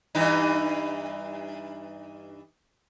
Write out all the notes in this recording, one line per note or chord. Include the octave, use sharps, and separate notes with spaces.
G2 E3 D#4